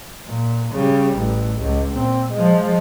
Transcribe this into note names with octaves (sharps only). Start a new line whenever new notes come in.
A#2
C#3 G3
A1
C#2
A#2 C4
F3 G#3